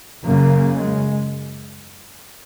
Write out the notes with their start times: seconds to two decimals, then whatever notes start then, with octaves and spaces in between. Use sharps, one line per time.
0.24 F#2 C#3 A#3
0.75 G#3